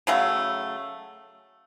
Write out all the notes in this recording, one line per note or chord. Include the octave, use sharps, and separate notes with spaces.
C#3 F#3 A3